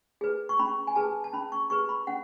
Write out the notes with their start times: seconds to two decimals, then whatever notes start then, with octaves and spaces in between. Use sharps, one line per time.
0.21 G#4 B4
0.49 C#6
0.59 C#4 B5
0.87 G#5
0.96 G#4 B4 A5
1.24 A5
1.33 C#4 B5
1.52 C#6
1.70 G#4 B4 C#6
1.89 B5
2.07 C#4 F#5